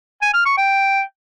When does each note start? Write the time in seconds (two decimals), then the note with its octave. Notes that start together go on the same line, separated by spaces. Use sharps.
0.22 G#5
0.34 F6
0.46 C#6
0.57 G5